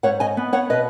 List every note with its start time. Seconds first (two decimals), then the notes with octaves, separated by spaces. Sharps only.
0.03 G#2 C#5 F#5
0.20 D#5 G#5
0.37 B3
0.53 C#5 F#5
0.70 B2 B4 D#5